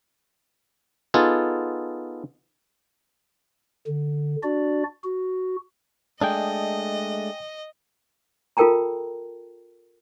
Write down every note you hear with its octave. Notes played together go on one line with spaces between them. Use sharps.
B3 D#4 F4 G#4 A4
D3
D4 F#4 D5
F#4
G#3 A3 D4 D#5 G5 G#5 D#6
F4 A4 A#4 G5 A5 A#5